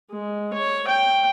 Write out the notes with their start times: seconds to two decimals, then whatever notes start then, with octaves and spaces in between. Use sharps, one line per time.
0.10 G#3
0.53 C#5
0.88 G5